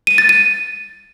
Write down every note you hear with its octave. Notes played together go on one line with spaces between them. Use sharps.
D#7
A6
D#7